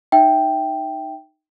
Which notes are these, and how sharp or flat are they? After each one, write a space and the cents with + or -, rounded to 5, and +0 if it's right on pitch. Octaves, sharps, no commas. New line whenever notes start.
D#4 -10 E5 +0 G5 +0